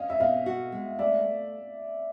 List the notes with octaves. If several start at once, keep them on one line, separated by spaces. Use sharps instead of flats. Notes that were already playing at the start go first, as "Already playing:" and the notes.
Already playing: C#4 D#5 F5
E5
B2 D#5 F5
F#4
G#3
A3 D5 E5